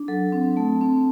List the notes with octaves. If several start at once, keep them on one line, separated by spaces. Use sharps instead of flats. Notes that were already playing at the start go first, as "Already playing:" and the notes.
Already playing: D4
F#3 A4
C4
A3
C4